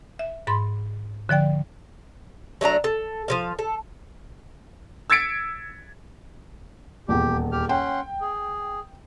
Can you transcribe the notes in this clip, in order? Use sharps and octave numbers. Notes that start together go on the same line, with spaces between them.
E5
G#2 B5 C6 A6
D3 F3 D5 G5
F#3 A3 D4 A#5
A4
F3 F#3 F5
A4
E6 G#6 A6 B6 C#7 D7
D#1 E2 G4
G4 F6
C#4 F#5 G5 C6
G#4